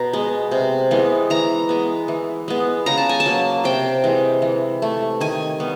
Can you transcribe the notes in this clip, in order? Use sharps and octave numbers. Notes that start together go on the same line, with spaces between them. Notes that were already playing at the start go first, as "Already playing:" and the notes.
Already playing: B2 A#5
G#3 B3
C3
E3 G#3 B3
E3 A#5
G#3 B3
E3
G#3 B3
C#3 A#5
A5
G#5
A5
F#3 A#3
C3 G5
E3 G#3
E3
A3
D#3 G#5
G3 B3